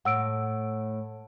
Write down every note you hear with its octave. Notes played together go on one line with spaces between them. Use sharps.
A2 F#5 E6 D7